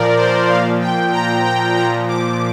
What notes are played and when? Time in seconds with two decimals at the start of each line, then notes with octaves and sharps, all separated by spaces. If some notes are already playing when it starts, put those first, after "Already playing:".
Already playing: A#2 F3 A#4 D5
0.17 C5
0.48 A#2 F3 F5
0.81 G5
1.12 A#5
1.44 G5
1.76 A#2 F3 A#5
2.08 D6